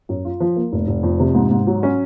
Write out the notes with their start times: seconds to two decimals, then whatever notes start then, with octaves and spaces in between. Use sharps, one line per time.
0.09 F#2
0.25 F4
0.40 F3
0.56 A#3
0.72 F1
0.88 F1
1.03 F2
1.20 C3
1.35 G#2
1.51 G#2
1.67 F#3
1.83 C#4